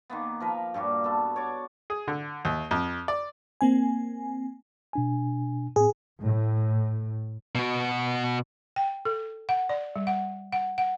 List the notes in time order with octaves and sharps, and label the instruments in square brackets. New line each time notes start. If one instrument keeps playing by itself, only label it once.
[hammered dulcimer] D#3 A#3 B3
F3 A#4 B4
G2 A#2 G3 F#4
B3 A4
C#5 D5 F#5
[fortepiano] G#4
D3
D#2
F2
D5
[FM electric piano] A#3 C4 G#5
[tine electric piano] B2 D4 G#5
[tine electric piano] A2 C4 [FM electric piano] G#4
[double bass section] A2
[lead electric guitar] B2 F#4
[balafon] G5
A4
F#5
D5
G3
F#5
F#5
F#5